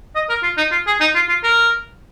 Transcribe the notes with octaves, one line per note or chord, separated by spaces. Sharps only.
D#5
A#4
F4
D#4
F4
G#4
D#4
F4
F4
A#4